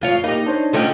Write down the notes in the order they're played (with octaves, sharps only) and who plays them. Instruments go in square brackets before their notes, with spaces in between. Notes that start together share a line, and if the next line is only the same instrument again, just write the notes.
[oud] F2 F4 C#5
[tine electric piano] A#3 G4 [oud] D#4
[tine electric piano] D4 C5 C#5
[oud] D3 A3 C#4 [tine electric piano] F4 D#5 G5